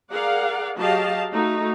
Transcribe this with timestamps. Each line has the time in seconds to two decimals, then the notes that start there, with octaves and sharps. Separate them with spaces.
0.10 G#4 A#4 D5 F5 F#5
0.76 F#3 G4 G#4 D#5 F5 A5
1.33 A3 D#4 F#4